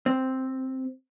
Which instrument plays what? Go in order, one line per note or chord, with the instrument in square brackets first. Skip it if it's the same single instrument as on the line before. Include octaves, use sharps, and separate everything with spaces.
[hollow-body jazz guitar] C4